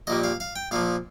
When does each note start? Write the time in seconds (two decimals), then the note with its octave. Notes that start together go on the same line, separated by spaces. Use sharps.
0.07 A#1 A#2 G3 D#5
0.24 F5
0.40 F5
0.56 G5
0.71 A#1 A#2 F3 F5